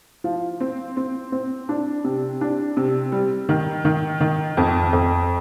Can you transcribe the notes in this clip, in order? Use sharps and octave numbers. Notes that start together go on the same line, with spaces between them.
F3
C4
C4
C4
D4
C3
D4
C3
G3
D#3
D#3
D#3
F2
F2